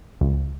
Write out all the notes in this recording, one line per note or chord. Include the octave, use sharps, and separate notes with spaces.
C#2